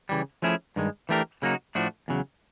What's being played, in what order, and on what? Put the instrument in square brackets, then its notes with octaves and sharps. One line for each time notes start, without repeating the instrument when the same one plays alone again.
[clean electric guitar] C#3 E3 G3
F3 A3 C#4 E4 G#4
G2 D#3 G#3
E3 A3 D4 G4 A#4
C#3 F#3 A#3 D#4 F#4
A2 F3 A3 D4 F#4
E2 C#3 F#3